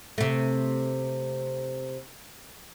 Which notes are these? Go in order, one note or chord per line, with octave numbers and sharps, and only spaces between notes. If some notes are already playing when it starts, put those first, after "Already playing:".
C3 A3